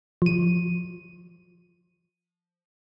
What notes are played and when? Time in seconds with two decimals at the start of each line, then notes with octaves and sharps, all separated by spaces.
0.22 F3 D#7